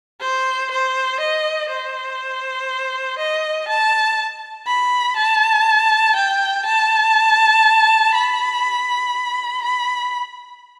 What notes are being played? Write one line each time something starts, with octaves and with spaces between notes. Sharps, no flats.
C5
C5
D#5
C5
D#5
A5
B5
A5
G5
A5
B5
B5